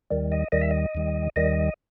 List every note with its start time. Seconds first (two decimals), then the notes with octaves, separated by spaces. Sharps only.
0.11 D#2 D#3 G3
0.32 D#5
0.52 D#2 D#3 G3 D#5
0.61 E5
0.71 D#5
0.95 D#2 D#3 G3
1.36 D#2 D#3 G3 D#5